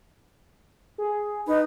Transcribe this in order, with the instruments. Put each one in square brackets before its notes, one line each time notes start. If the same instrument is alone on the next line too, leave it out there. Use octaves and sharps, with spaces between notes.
[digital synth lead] G#4
[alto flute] D#4 [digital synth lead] B4